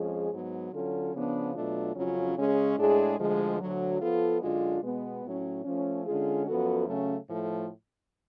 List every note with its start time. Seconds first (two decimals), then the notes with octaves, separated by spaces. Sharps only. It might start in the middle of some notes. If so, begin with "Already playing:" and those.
Already playing: F2 F3 G#3 C#4 G#4
0.31 G#2 F#3 B3
0.72 D3 F#3 C#4 F4 A4
1.13 C#3 F3 B3 D4
1.54 B2 F#3 A3 D4 F4
1.95 F2 C#3 F#3 C#4 F4
2.36 C#3 G#3 C#4 G#4
2.78 A2 G#3 D4 G#4
3.19 D2 D3 F3 G#3
3.59 D2 D3 F#3
4.00 F3 B3 F4 A4
4.42 F#2 D3 G#3 D4 F4
4.82 B2 G#3 B3
5.24 A2 F#3 C#4
5.65 F3 A3 C#4
6.05 D3 G#3 C#4 F4 G#4
6.47 F#2 F3 B3 F#4 A4
6.87 C#3 F#3 A3 C#4
7.28 A2 F3 A3